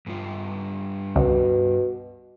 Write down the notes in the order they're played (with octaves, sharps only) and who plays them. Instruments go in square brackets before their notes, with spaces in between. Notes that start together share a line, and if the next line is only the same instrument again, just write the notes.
[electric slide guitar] G2 G3 F4
[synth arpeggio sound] C#2 [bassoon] B2